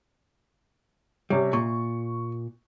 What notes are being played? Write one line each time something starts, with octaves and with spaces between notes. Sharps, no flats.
C3 G3 C#4 C#5
A#2 C#6